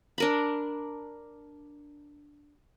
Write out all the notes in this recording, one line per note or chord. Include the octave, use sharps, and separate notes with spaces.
D4 A#4 B5